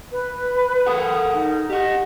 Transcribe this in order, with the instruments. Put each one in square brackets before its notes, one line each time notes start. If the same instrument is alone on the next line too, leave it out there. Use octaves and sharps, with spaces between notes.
[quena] B4
[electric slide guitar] A4 A#4 F#5 [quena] D#6
[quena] D#4
[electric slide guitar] G4 F#5 [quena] D#5